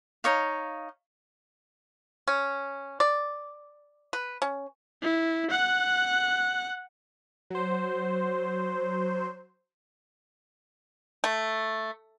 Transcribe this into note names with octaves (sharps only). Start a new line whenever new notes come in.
D#4 C#5 F5
C#4
D5
B4
C#4
E4
F#5 F#6
F#3 C5
A3